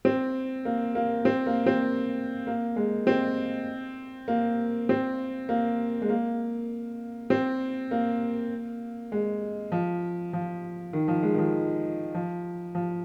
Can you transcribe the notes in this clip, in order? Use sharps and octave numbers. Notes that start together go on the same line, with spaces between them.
C4
A#3
A#3
C4
A#3
C4
A#3
G#3
C4
A#3
C4
A#3
G#3
A#3
C4
A#3
G#3
F3
F3
D#3
F3
G#3
D#3
F3
F3
F3